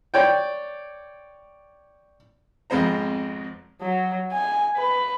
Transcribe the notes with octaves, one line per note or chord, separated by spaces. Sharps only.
C#5 D5 G5
G#1 F2 G#3 B3 C5 A#5
F#3
G#5
B4